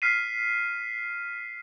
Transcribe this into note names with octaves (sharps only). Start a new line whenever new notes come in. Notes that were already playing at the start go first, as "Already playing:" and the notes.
F6 B6 C7 D#7